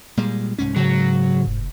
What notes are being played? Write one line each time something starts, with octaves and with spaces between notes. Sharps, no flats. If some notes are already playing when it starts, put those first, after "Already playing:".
A#2 G3 G#3
C2 G#2 C#4
G#2 C#3 F#3
F1